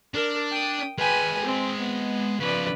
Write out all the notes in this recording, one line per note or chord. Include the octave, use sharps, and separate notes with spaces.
D4 A#4
G5 D#6
G#3 B4 G5 G#5
C4
B3
C#3 F3 B4 D5